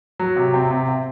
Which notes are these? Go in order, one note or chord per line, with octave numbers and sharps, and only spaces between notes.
F#3
C3
C4
C3
C3